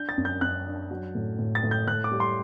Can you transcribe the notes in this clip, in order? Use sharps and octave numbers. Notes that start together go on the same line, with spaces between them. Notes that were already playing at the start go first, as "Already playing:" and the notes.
Already playing: D4 G6
A6
F#2
G6
F#2 F#6
D4
F#3
A2
A2
A6
A2
G6
A2 F#6
D6
G3
C6